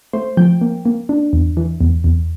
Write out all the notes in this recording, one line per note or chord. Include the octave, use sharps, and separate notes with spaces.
A3 C5
F3 G5
A#3
A#3
D4
E2
E3
E2
E2